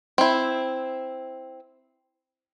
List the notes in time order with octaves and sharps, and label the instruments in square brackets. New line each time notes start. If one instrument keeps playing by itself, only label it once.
[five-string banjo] C4 E4